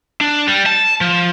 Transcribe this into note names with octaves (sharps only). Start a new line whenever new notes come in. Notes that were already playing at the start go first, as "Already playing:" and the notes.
D4
G3
A5
F3